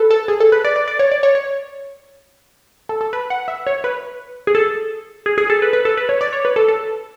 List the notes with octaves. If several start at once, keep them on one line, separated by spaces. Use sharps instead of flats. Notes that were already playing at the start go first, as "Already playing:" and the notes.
Already playing: A4 B4
A4
G#4
A4
B4
D5
D5
D5
C#5
D5
C#5
C#5
A4
A4
B4
F#5
E5
C#5
B4
G#4
A4
G#4
G#4
A4
B4
B4
A4
B4
C#5
D5
C#5
B4
A4
A4